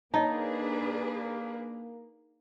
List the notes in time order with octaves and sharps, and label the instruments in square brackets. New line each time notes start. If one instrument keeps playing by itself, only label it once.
[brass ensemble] A#3 [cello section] D4 G#4 B4 [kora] D#4 [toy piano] C#5 D#5 A5